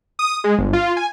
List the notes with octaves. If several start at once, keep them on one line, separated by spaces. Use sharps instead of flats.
D#6
G#3
G1
F4
G#5